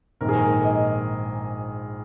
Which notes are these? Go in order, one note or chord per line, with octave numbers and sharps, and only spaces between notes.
A#1 G#2 D#3 A#4
G#4
A#4
D#5